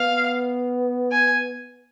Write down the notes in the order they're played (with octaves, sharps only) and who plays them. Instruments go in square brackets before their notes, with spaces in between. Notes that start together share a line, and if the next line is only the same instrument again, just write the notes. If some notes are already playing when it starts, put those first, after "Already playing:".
Already playing: [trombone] B3 [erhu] F5
[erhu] G#5